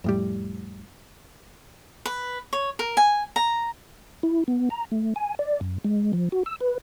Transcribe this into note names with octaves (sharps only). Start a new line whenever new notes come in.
F2 A2 G3
B4
C#5
A#4
G#5
A#5
E4
B3
A#5
A3
G#5
D5
F#2
G#3
F3
F#4
E6
B4